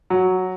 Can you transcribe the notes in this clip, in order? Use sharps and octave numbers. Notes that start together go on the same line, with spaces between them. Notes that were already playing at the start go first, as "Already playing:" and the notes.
F#3